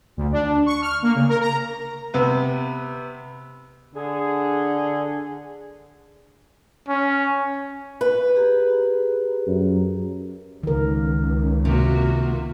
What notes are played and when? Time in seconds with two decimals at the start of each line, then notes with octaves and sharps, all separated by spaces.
0.17 D2
0.32 D4
0.66 C#6
0.82 F6
1.03 A#3
1.15 C#3
1.29 A#4
1.41 A#5
2.14 C3 B3 B4
3.94 D3 G#4
6.89 C#4
8.01 B4
8.36 G4 G#4 A#5
9.47 F#2
10.63 C#2 D#3 A#4
11.65 C3 A#3 F4 F#4